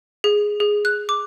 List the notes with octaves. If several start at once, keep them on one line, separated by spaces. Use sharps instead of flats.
G#4
G#4
F#6
D6